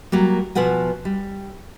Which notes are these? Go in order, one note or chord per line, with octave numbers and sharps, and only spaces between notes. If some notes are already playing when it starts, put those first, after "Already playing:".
F#3 G3 A#3
B2 F3 B4 F#5 G#5
G3